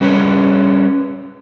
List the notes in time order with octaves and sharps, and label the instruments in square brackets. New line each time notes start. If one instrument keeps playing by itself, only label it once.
[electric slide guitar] G3 C#4 B4 C#5